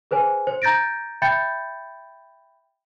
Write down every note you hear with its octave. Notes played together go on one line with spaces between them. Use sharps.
G#4 B4 C5 G#5
C5
A#5 G6 A6 A#6 D7
E5 G5 B5 G6 A6 C#7